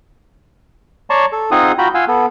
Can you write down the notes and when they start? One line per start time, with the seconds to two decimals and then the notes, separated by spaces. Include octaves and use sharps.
1.10 C#5 D5 A5 A#5 C6 C#6
1.32 A4
1.51 C4 D#4 F4 G#4 F#5 D#6
1.78 F4 F#4 G5 A#5 B5
1.95 F4 F5 F#5 G#5 E6
2.08 B3 A4